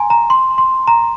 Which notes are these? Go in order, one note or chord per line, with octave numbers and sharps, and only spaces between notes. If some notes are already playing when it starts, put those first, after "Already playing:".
Already playing: G#5 A#5 C6
A#5
C6
C6
A#5